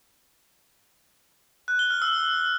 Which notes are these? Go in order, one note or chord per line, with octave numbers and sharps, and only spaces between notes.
F#6
G7
F6
E6